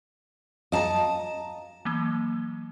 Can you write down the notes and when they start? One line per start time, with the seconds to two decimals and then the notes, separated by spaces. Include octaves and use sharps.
0.72 D#5 F5 A5 A#5
1.85 E3 F#3 A#3